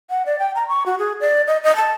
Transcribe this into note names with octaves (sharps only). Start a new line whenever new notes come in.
F#5
D5
G5
A#5
C#6
F#4
G#4
D5
D#5
D#5
A5